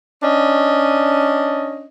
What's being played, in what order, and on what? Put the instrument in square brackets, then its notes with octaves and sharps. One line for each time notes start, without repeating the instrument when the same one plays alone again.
[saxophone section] C#4 D4 D#5